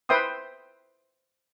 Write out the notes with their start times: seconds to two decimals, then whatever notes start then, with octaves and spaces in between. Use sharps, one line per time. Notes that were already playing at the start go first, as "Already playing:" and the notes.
0.09 B4 C5 E5 G5 C6 D#6